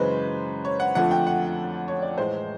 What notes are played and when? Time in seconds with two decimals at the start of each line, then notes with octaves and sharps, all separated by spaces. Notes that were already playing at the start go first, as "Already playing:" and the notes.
Already playing: F#2 C#3 E3 G#3 B4 C5
0.65 C#5
0.80 F#5
0.95 F2 D3 F3 A3 F#5
1.11 G5
1.27 F#5
1.88 C#5
2.02 D5
2.18 A2 E3 G#3 C5